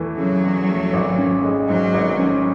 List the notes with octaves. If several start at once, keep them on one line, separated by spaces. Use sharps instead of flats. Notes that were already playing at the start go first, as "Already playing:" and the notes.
Already playing: E2 E3 A3
C#3 F#3
E2
A3
G#1
C#4
G#3
G#2 F#3
G#1
C#4